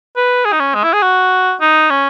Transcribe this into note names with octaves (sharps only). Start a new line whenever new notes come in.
B4
G#4
D#4
C#4
G#3
E4
G#4
F#4
D#4
C#4